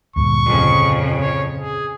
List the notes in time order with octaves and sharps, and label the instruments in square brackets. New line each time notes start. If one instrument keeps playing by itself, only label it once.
[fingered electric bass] D2 G2 A#2 [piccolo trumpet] C#6
[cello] F2 C#3
[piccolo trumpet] C#5
G#4